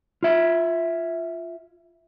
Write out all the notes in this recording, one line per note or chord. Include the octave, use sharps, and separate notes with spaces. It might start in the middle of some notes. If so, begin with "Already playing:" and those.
F4 E5